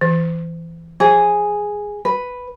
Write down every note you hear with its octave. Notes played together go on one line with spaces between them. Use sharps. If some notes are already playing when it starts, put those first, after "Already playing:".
E3
F3 G#4
B4